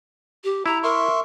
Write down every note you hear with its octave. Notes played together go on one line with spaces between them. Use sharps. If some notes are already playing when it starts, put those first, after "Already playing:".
G4
E4 A#5
A#4 E5 C6 C#6